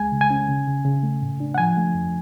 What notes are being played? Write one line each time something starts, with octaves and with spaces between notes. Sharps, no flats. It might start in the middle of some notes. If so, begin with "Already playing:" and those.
Already playing: C#2 G#3 G#5
C#3
G#5
C#4
C#3
C#3
C#3
A3
A2
D4
F#5
F3 G#5
A3
F2